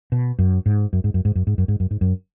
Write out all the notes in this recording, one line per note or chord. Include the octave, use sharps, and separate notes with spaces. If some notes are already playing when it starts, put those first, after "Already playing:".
B2
F#2
G#2
F#2
G#2
F#2
G#2
F#2
G#2
F#2
G#2
F#2
G#2
F#2